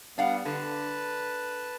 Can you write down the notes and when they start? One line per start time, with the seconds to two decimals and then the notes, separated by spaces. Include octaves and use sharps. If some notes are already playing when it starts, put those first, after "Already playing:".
0.18 G3 B3 D4 F5 F#5
0.45 D3 B4 A5